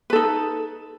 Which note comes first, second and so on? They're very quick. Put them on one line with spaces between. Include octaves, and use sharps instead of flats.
B4 A4 D#4